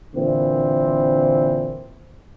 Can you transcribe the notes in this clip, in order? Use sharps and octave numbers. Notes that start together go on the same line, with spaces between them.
A#2 D3 E3 C4